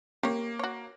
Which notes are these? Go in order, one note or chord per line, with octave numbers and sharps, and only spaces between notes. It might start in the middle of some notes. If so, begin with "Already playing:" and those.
A#3 G4 C#5
F#4 C#5